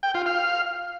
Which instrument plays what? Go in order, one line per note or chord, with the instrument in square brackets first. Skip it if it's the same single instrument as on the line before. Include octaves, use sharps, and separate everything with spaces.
[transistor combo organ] G5
F4
F5